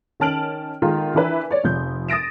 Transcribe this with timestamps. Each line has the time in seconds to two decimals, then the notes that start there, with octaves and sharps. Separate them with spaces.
0.20 D#3 C#4 A5 F6 D7 F#7
0.82 D#3 G#3 F4 A4 A#4
1.14 E3 D4 E4 A#4 B4
1.51 C#5 D5
1.64 F1 F3 G6
2.08 D#6 A6 A#6 D7 E7